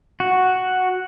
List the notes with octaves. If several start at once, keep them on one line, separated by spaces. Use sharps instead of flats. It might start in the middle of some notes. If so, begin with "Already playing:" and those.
F#4